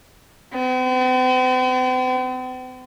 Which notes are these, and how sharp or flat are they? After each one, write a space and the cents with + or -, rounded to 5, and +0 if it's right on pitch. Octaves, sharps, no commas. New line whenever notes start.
C4 -45